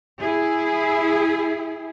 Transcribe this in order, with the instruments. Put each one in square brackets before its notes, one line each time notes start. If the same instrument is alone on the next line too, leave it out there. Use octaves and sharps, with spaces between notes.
[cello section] E4 G#4